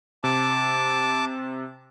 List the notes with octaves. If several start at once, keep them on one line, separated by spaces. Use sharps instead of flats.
C3 A5 D6